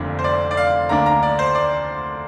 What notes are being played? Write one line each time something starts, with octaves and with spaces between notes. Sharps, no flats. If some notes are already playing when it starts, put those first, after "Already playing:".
Already playing: F1 F2 D3 A#3 D4
C5
D5
D5
F5
D2 D3 A#3 D4 A#5
A#5
D5
C5
D5